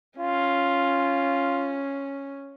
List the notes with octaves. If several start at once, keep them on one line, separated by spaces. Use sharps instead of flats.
C#4 F4